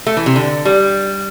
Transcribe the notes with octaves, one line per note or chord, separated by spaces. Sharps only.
A3
E3
C3
D3
G3